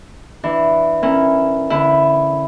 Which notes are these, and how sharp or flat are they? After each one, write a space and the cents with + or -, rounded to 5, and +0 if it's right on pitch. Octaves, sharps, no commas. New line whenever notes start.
E3 +0 D4 +5
C#4 -25 E4 +0 A#4 -10
D3 -25 E4 +0